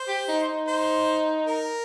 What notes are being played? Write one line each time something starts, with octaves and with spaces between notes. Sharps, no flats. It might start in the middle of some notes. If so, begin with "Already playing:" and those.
Already playing: C5
G4
D#4
D#4
C5
A#4